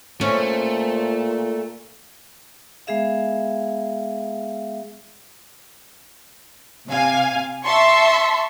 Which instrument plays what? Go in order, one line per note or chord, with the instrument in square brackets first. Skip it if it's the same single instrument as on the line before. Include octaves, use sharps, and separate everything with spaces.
[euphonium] A#2 [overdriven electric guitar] A3 [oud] C#4 [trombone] C5
[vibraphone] G#3 B3 G#4 E5 F5
[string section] C3 F5 G#5
E5 A5 C6 C#6